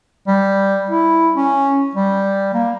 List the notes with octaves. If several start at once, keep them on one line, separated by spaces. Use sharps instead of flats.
G3
E4
C#4
G3
A#3